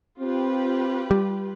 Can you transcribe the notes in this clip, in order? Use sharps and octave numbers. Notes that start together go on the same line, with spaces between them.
C4 F4 G4 B4
G3